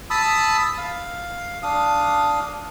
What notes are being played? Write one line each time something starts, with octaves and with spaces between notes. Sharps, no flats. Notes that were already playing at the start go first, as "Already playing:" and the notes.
A5 B5 D#6 E6
F5
D4 F5 D#6